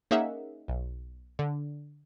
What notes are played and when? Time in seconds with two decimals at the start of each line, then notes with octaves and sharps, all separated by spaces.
0.11 A#3 C#4 D#4 G#4 E5 F#5
0.68 B1
1.39 D3